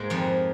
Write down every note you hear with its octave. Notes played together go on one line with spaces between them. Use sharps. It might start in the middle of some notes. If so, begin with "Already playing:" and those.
Already playing: G#2 G#3 A#3
F2 F3